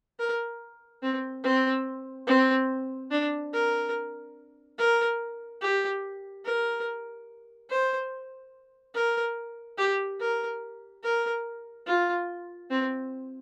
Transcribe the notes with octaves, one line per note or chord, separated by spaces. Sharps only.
A#4
C4
C4
C4
D4
A#4
A#4
G4
A#4
C5
A#4
G4
A#4
A#4
F4
C4